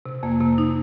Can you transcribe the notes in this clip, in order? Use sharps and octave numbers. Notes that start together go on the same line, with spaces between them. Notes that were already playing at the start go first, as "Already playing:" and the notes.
C3
F2 A#3
C3 A#3
D#4